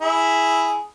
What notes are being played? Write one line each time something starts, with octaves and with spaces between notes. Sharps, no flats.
E4 G#4